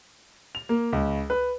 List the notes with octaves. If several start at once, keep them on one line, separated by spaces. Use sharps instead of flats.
F7
A#3
C#2
B4